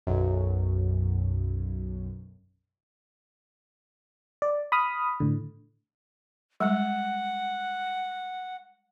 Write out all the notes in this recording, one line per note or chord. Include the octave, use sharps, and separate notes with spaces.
B1 F#2
D5
B5 D#6 F6
A2 D3
G3 G#3 F#5